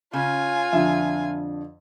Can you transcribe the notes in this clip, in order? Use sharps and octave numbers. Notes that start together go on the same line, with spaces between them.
C#3 C#4 F4 G#5
F2 D3 E5